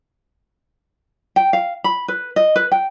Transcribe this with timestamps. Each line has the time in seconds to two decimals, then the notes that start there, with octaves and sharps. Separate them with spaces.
1.36 G5
1.53 F5
1.84 B5
2.08 B4
2.36 D#5
2.56 B4
2.72 G5